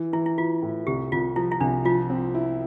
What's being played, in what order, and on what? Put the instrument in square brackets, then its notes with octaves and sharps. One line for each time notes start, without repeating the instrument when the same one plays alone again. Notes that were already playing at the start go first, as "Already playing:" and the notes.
Already playing: [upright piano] E3
[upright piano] E3 [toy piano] E4
[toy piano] E4
[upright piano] E3 [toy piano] F4
[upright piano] A2
[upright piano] C2 [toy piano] G4
[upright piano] C2 [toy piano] F4
[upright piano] F3 [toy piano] E4
[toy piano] E4
[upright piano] C2 [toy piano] D4
[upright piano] F3 [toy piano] F4
[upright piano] C4
E4